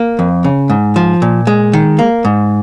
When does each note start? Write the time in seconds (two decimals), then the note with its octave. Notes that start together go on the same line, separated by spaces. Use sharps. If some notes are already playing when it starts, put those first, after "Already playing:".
Already playing: A#3
0.19 F2
0.44 C#3
0.70 G#2
0.96 F3
1.22 A#2
1.47 G#3
1.73 D#3
1.99 A#3
2.25 G#2